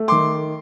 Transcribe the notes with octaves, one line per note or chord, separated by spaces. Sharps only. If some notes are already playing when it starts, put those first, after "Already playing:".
Already playing: A3
D#3 C6 D6